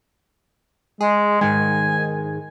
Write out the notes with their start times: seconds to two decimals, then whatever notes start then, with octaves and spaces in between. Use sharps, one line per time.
1.01 G#3 G#4
1.41 G#2 D#3 G#3 G#5